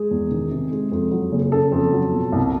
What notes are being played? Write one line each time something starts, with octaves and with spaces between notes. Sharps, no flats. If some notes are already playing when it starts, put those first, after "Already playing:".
Already playing: G#3 G#4
E2
D#3
C3
G#3
F2
F#3
F#1
C#3 A4
F2
F#3
B2
C2